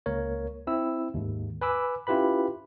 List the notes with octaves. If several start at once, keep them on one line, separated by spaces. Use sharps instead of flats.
C#2 A#3 A#4 C#5
C4 E4 E6
D#2 G#2
B4 G#5 B5 D6 E6
C#4 E4 F4 G4 B4 B5